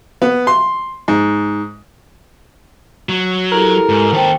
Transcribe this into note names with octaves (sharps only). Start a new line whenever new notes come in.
B3
C6
G#2
F#3
E4 G4 A4 A#4
G#2
D#2 A4 C5 G5